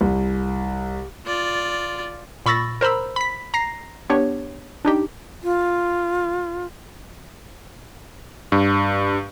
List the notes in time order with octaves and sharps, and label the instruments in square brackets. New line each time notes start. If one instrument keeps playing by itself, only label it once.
[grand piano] C2
[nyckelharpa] F4 D5
[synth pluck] A#2 B5 C#6 E6 A6 A#6
A#4 C5 A#5 B5 E6
B5 B6
A#5 A#6 C7
B3 D4 G4 C#5
D4 D#4 G4
[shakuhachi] F4
[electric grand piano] G2